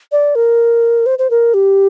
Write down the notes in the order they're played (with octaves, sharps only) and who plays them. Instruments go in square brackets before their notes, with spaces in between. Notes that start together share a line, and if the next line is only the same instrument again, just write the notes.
[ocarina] D5
A#4
C5
C5
A#4
G4